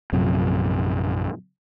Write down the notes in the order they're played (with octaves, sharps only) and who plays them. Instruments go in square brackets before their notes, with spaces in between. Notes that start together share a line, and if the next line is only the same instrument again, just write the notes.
[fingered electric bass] A#1 F#2 C3